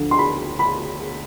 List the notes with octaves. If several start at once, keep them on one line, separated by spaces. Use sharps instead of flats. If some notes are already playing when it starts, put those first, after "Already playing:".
Already playing: D2 D3 F3
C6
B5
B5